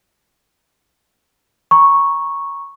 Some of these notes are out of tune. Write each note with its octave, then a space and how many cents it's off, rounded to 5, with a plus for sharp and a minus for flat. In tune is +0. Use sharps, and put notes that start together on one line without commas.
A#5 +20 C#6 -5